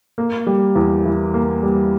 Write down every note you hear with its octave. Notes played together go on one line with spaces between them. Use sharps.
A#3
G3
E2
E3
A#3
G3